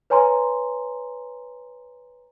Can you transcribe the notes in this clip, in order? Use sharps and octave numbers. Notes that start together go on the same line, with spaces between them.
B4 C#5 G#5 A#5 C6